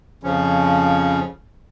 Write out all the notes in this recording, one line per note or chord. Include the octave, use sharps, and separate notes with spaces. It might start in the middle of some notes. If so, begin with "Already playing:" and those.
F2 C#3 F3 C#4